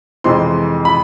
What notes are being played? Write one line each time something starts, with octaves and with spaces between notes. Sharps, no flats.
F2 C3 E3 G#3 C4 C6
B5